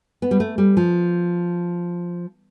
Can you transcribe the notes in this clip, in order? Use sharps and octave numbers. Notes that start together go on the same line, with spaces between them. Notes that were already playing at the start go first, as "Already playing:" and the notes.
B3
G3
A3
G3
F3